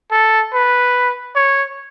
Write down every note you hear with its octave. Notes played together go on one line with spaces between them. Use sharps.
A4
B4
C#5